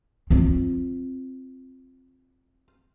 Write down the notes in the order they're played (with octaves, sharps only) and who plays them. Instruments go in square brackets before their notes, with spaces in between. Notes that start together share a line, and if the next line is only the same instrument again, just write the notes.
[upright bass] C4 F4